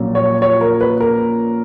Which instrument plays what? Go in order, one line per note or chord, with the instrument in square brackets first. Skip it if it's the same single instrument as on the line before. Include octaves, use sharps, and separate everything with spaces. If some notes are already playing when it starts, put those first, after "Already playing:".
Already playing: [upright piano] A#1 A#2 F#3 C#4
C#5
C#5
A#4
B4
A#4